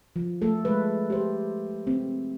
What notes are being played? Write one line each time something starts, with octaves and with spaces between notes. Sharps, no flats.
F3
A3 A4
G#3 B4
G4 C5
C4